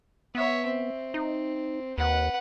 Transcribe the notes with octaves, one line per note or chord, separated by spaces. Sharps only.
B3 C#5 E5
C4
D#4
D#2 B4 F#5